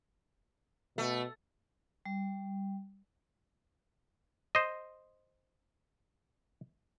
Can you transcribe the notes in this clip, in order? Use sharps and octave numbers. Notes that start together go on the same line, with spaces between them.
B2 A3
G3
C5 D#5